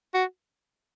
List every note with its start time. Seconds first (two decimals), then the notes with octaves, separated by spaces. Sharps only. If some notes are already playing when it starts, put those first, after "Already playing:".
0.14 F#4